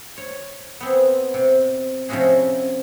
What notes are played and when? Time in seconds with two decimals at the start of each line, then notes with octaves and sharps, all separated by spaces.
0.18 C#5
0.80 B3 C4 G#4
1.34 C3
2.09 C3 F3 C#4 E4 F#4 G#4